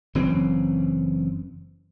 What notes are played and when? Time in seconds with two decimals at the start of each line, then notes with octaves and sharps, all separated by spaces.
0.15 F#1 E3 C4 C#4